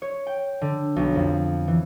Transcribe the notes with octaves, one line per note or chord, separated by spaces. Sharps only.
C#5
G5
D3
B1
F2
E3